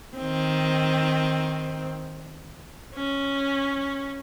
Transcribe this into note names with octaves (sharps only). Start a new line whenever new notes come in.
D#3 C4
C#4